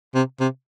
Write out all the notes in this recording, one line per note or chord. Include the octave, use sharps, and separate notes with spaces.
C3
C3